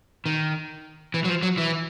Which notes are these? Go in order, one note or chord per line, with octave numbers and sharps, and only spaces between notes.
D#3
E3
F#3
F3
F#3
E3